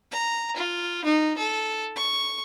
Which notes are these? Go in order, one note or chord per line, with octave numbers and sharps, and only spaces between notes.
A#5
F4
D#4
A4
C#6